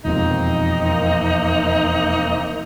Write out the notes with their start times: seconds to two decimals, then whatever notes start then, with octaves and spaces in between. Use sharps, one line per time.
0.05 E1 F2 C3 A#3 C4 D#4